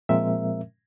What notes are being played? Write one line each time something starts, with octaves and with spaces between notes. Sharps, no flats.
A#2 F3 G#3 C4 A#4 E5